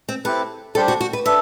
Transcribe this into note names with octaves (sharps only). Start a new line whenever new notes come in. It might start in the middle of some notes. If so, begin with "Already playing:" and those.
C4
C4 E4 G4 A4 B4
G3 D4 G4 A4 C5
F#4
F#4
B4
D4 A4 B4 E5